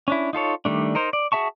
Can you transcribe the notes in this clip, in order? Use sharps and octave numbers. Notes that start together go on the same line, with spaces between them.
C#4 D4 E4
D#4 F4 A4 C#5
D#3 G3 A3 D4
D#4 A#4 C5
D5
F#4 G#4 E5 A5 C#6